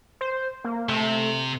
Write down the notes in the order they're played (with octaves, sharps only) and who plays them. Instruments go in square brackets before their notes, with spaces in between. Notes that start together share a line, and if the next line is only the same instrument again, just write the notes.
[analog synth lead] C5
A#3
[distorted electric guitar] C3 [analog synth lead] A3